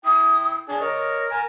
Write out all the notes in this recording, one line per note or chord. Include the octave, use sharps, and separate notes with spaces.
E4 G5 D#6
D4 G#4
A#4 C#5 D#5
G#5 A#5